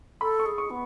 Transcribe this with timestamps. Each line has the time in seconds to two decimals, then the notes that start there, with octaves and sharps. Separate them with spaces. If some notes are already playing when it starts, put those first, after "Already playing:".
0.21 A4 B5
0.39 C#6
0.46 G#4
0.58 C#6
0.70 B3